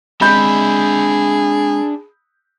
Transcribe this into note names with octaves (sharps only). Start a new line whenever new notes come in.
G#3 C4 D4 G#4 D#5 E5 B5 G6